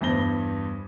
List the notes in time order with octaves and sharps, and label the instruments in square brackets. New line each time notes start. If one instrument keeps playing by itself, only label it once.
[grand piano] E2 G2 C5 A#6 G7